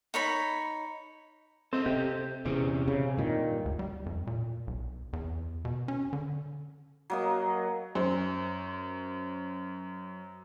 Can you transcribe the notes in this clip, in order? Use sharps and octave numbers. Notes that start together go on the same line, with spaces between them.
D#4 C#5 B5
C4 A4 C5 D#5
C3 G4
E2 C3 C4 C#4
C#3
G2 A#2 D#3
D2
G3
F2
A#2
B1
E2
B2
C#4
D3
F#3 A#3 D#5
F#2 C5